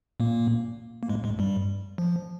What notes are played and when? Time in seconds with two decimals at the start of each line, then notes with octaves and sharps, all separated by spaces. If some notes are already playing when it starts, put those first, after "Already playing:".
0.20 A#2 A#3
1.03 A#3
1.09 G#2 G#3
1.24 G#2 G#3
1.39 G2 G3
1.98 F3